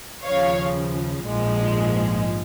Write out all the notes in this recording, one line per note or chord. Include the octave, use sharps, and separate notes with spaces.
D#2 C#3 F3 C#5 F5
A#1 G#2 F3 G#3